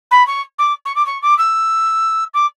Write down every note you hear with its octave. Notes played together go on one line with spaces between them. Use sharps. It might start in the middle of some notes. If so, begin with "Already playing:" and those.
B5
C#6
D6
C#6
D6
C#6
D6
E6
D6